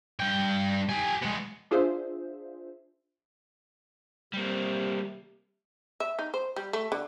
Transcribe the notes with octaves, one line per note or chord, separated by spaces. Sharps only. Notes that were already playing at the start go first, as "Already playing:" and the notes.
G2 G5
G4 G#5
G#3 B3
D4 F4 G#4 C5 E5
C3 G3 A#3
E5
D#4
C5
G3
A3
D3